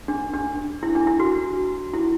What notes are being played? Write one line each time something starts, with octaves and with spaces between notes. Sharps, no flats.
D4
D4
E4
D4
E4
F#4
E4